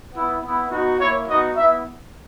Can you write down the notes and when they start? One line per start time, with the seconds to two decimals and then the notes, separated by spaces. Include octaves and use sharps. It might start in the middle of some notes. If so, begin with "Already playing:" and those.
0.13 B3 E4
0.42 B3 E4
0.69 B3 D#4 F#4
0.99 A#3 E4 C#5
1.27 B3 D#4 F#4 D#5
1.56 B3 E4 E5